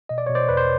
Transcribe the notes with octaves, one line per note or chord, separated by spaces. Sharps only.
B2 D#5
D5
B2 C#5
C5 D5
E2 B4
C5